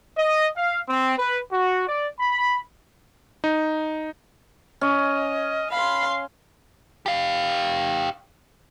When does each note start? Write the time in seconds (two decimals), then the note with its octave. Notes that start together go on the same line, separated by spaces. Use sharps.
0.17 D#5
0.56 F5
0.88 C4
1.18 B4
1.52 F#4
1.88 D5
2.20 B5
3.44 D#4
4.81 C#4 D#5
5.71 F5 B5 C6
7.06 G4 F5